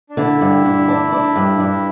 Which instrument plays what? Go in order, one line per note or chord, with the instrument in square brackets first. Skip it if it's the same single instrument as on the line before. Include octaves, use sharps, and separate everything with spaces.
[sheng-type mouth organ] D4
[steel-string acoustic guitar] D3 [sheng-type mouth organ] E4
[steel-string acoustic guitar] G2
D3
D4
D4
G2
G2